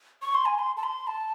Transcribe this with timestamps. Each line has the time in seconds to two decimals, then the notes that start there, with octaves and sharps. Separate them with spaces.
0.22 C#6
0.34 C6
0.45 G#5
0.59 C6
0.77 A5
0.83 C6
1.07 A5